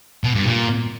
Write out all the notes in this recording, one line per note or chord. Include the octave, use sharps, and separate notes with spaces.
B2
G2
A#2